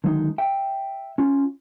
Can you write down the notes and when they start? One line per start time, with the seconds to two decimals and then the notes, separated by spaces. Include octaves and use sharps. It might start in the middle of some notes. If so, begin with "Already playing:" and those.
0.04 D3 D#3 F#3 G#3 D4 D#4
0.38 E5 G5
1.18 C#4 F4